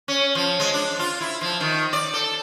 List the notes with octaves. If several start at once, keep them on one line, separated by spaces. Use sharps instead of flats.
C#4
F3
G#3
D4
F4
E4
F3
D#3
D5
A4